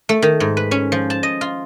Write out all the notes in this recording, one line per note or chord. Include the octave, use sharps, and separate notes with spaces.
A3
D#3
G#2
B4
C#4
F3
A5
D#5
F4